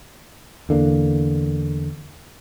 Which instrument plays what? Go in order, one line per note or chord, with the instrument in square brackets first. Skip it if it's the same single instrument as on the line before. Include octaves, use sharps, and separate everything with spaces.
[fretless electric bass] E2 D3 A#3